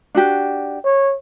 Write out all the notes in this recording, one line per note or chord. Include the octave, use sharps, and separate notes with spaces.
D4 F#4 G4
C#5